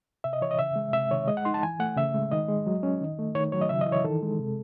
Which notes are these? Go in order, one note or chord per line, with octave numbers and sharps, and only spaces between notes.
C3 E5
D#5
E3 C#5
D#5
C#3 E5
G#3
C3 E5
D#3 C#5
G#3 D#5
F#5
D#4 C6
A5
E3 G#5
A3 F#5
C#3 E5
G#3
D#3 D#5
G#3
F#3
C#4
D#3
A3
D#3 C#5
F#3 C#5
D#5
C#3 E5
D#5
E3
C#5
D#3 A4
G#3
C3